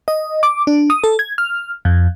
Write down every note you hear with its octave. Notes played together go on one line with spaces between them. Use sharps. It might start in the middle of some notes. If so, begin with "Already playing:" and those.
D#5
D6
D4
D#6
A4
G#6
F6
F2